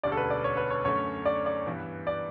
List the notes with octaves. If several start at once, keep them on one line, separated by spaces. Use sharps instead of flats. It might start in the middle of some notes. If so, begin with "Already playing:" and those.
E1 D2 D3 G3 C#4 D5
A4
B4
D5
C#5
B4
C#5
F#2 D3 A3 C#4 C#5
D5
D5
G2 E3 B3
D5